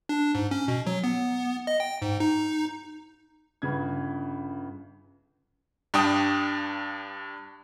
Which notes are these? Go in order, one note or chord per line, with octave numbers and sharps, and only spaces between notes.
D4
G#2
C#4
B2
F#3
B3
D#5
G5
G#2
D#4
G1 C#3 B4 G#6
G2 D4 G5 D#6